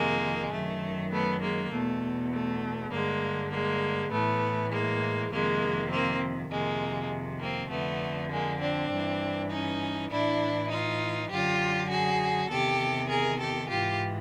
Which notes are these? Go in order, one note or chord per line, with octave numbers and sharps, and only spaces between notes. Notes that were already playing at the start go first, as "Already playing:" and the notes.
Already playing: F2 C3 D#3 G#3 A#3
F#2 D#3 A3
A3 B3
G#3 A#3
E2 B2 A3
A3
G2 D3 G#3 A#3
G#3 A#3
A2 E3 A3 B3
G#3 A#3
F2 C3 D#3 G#3 A#3
A#3 C4
F2 C3 D#3 G#3 A#3
A#3 C4
F2 D3 A3 B3
G#3 A#3
C4 D4
G2 E3
C#4 D#4
A2 E3 D4 E4
D#4 F4
F#2 D3 F4 G4
F#4 G#4
E2 C3 D#3 G4 A4
G#4 A#4
G4 A4
G#2 E3 F4 G4